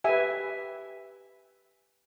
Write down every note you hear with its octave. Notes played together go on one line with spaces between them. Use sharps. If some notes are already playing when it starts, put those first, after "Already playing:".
G4 B4 E5 G#5